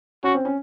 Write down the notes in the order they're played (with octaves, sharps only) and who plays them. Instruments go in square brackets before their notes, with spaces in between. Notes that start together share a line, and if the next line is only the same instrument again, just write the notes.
[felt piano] C#4 [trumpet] F#4
[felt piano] C4
C#4